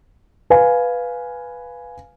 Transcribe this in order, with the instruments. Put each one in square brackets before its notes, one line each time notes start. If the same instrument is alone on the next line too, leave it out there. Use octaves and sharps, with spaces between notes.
[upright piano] B4 F5 G#5